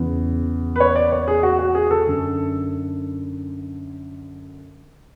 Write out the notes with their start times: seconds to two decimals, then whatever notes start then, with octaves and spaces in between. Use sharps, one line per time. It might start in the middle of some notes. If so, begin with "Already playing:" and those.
Already playing: E2 C#3 E3
0.76 B4
0.80 C#5
0.96 D5
1.12 C#5
1.28 G#4
1.43 F#4
1.59 F#4
1.75 G#4
1.91 A4
2.07 F#2 D3